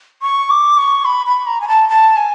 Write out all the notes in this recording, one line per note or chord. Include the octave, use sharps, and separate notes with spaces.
C#6
D6
C#6
B5
B5
A#5
G#5
A5
A5
G#5